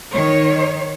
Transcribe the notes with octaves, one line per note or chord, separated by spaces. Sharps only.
D#3 C#5